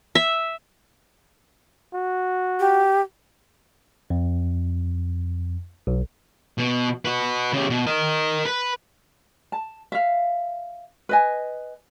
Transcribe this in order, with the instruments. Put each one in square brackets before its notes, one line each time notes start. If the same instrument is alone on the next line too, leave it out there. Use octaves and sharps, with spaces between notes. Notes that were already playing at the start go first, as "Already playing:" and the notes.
[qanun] E5
[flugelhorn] F#4
[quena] G4
[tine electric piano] F2
B1
[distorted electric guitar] B2
F#4 B4
C#3 G4
B2
A#4 D#5
B4
[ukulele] A5
E5 F5
B4 D#5 G#5